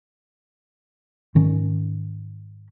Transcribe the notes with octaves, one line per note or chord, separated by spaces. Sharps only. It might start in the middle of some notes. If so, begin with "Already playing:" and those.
G#2 D#3 C#4